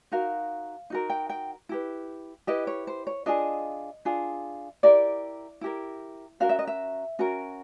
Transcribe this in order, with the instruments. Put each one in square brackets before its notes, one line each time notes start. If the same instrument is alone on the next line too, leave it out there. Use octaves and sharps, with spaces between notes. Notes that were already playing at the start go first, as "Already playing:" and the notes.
[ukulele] D#4 F#4 A#4 F5
D#4 F#4 A#4
G5
G5
E4 G4 B4
E4 G4 B4 D#5
C#5
C5
C#5
D4 F4 G#4 D#5
D4 F4 G#4
E4 G4 A#4 D5
E4 G4 A#4
C#4 F#4 A#4 F5
E5
D#5
E5
C#4 F#4 A#4